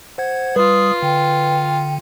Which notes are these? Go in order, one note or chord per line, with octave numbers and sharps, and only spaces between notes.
C5 F#5 G#6
G3 F4 B4 D#6
D3 G5